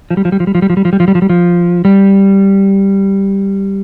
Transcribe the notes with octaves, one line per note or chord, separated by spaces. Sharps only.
F3
G3
F3
G3
F3
G3
F3
G3
F3
G3
F3
G3
F3
G3
F3
G3
F3
G3